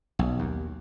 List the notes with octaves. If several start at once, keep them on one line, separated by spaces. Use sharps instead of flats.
B1
D#2